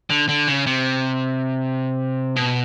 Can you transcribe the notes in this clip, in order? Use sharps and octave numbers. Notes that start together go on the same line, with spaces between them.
D3
D3
C#3
C3
B2